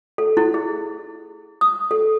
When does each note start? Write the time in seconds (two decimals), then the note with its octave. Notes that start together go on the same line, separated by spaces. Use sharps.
0.18 A4
0.37 E4
0.54 G#4
1.61 D#6
1.91 A4